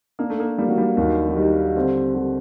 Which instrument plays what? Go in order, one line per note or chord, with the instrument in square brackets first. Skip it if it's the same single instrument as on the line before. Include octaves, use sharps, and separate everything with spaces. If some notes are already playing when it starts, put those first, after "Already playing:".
[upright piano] A#3 [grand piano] D4
[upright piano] A3
A#3
[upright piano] G3 [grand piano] A#3
[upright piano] F#3
G3
[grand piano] D#2 [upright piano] F#3
[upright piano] F#3
[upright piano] D#3 [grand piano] G3
[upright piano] D3 [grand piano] C4
[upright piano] D3 [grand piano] G3